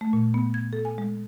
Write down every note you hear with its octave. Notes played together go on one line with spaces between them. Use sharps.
A3
A#2
B3
G#6
A4
G#5
G#3